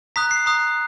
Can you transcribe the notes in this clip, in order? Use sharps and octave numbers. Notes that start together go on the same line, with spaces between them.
A#5 D#6 F#6 B6
C7
A#5 D#6 F#6